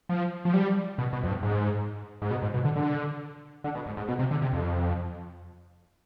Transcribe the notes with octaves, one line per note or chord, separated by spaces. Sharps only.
F3
F3
G3
B2
B2
F2
G2
G#2
G#2
B2
G#2
B2
D3
D3
D3
B2
G#2
G#2
B2
C3
D3
C3
F2